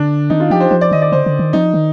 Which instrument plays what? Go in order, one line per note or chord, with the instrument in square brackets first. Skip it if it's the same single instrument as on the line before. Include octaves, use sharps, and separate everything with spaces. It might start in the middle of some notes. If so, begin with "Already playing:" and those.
Already playing: [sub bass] D3 [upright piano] D4
[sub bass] D#3 [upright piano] D#4
[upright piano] F4
[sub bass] F3 [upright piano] G4
[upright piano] C5
[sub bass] F3 [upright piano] C5
[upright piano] D5
[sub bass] D#3 [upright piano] D#5
[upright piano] D5
[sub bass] D3 [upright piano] C5
[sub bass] D3
D#3
[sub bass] F3 [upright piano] D#4
[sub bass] D#3